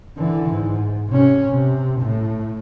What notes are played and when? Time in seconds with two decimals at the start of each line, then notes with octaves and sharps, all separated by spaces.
0.17 D3 E3
0.50 G#2
1.08 C3 C#4
1.48 C3
2.00 A2